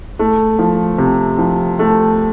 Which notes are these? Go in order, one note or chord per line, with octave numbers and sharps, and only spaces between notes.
A3
F3
C3
F3
A3